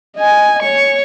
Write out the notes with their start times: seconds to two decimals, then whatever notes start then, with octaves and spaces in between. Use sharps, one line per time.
0.17 D#5 G#5
0.63 C#5 C#6